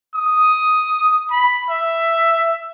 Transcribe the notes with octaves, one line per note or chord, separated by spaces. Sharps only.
D#6
B5
E5